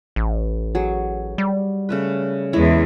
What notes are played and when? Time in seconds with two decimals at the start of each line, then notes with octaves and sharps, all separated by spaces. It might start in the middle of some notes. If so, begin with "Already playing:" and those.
0.16 A1
0.75 F#3 G#4
1.38 G3
1.89 C#3 A3 B4
2.53 E2 G#3 E4 C#5